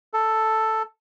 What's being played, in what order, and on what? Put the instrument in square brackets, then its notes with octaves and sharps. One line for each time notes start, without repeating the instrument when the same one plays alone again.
[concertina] A4